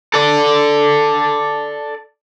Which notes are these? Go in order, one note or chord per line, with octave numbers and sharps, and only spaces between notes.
A4 D5